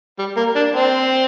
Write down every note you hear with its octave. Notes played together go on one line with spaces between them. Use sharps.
G3
A#3
D4
C4